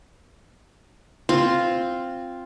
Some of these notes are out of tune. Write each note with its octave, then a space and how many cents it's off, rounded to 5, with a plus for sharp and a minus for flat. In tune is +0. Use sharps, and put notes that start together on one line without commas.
C4 +5 F4 +0